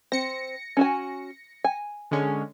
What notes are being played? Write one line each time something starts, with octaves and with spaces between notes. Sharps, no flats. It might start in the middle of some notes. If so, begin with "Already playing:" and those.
C4 A#6 C#7
C#4 F#4 G#5
G#5
D3 G#3 C#4